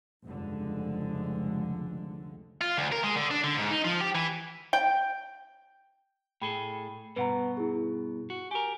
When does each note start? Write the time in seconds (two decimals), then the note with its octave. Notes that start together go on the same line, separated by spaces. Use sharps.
0.26 F1 C#2 G2 D3 G#3
2.61 F4
2.78 D2
2.92 A#4
3.03 G#3
3.16 D3
3.31 D4
3.44 D3
3.57 G#2
3.71 D#4
3.84 F3
4.01 G4
4.15 E3
4.73 G5
6.42 A2 G#4 A4 G5 B5
7.16 G2 B2 B4 F#5 A#5
7.57 E4 G#4
8.30 F#4
8.51 G4 A#4 G#5